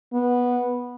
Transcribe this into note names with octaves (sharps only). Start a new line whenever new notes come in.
B3